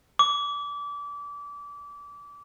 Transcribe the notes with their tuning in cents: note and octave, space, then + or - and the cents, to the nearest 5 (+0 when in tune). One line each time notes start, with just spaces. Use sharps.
D6 -25